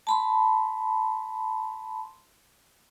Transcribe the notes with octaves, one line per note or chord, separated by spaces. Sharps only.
A5 B5 C6